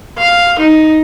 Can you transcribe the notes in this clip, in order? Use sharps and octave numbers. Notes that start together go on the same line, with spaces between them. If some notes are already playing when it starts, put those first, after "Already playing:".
F5
D#4